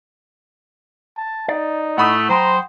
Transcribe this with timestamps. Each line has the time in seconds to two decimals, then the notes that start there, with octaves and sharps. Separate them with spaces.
1.17 A5
1.48 D#4 D5
1.98 A2 A3 F#5 B5 D#6
2.29 F#3 C5 G5 A#5 C6